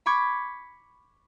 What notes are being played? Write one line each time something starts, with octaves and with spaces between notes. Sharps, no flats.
B5 C#6 D6 G#6